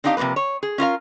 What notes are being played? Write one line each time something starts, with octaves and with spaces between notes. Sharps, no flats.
C4 D4 D#4 G4 F5
C3 F3 F#3 A#3 B4
C#5
G#4
C#4 F4 A#4 F5